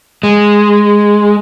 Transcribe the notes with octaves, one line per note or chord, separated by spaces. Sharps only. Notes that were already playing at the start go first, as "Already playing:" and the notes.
G#3